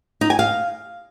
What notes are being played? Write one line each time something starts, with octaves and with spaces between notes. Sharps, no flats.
D#4
G#5
F5